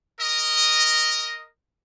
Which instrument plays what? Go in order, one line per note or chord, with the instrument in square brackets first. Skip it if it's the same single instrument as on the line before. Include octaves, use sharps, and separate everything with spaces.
[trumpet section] A#4 D#5